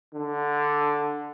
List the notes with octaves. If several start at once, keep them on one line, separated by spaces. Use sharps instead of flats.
D3